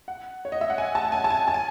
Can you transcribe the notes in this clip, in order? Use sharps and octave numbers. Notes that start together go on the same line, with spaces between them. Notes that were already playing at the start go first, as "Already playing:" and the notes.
F#5
C#5
D#5
E5
F#5
G#5
A5
G#5
A5
G#5
A5
G#5